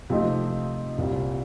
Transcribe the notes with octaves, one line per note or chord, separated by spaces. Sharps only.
C3 F3 A3 C4 D#4
C2 A#2 G3 C4